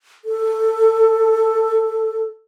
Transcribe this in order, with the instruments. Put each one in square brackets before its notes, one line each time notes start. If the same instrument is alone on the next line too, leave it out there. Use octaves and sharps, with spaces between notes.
[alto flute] A4